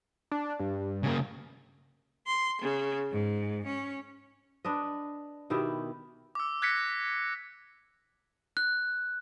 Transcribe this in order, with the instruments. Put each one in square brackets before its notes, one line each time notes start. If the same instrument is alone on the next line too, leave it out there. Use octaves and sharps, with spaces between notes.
[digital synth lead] D4
G2
[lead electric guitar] C#3 A#3
[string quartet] C6
C#3
G#2
C#4
[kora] D4 B4 D#5
B2 D#3 E4 G4
[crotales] D6 E6
F#6 G#6 A#6 B6 C#7
[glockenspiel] F#6